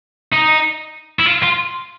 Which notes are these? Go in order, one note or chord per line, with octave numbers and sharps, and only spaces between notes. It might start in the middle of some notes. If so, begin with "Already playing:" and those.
D#4
E4
F4
F4